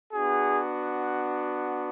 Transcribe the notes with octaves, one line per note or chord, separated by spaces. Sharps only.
B3 D4 F#4 G#4